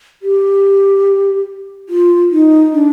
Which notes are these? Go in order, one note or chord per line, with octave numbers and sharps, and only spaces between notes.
G4
F4
D#4
D4